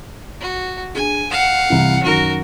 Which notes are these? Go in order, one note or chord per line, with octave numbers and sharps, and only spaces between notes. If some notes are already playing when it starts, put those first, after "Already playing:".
F#4
D4 G#4 G#5
F5 F#5 E7
C2 E3
F#2 D#3 F#4 A#4